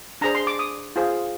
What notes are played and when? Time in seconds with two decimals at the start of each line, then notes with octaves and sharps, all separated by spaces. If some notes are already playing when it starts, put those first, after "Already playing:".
0.21 D4 G#4 C5 A#5
0.35 C6
0.47 D6
0.59 D#6
0.96 F4 G#4 C5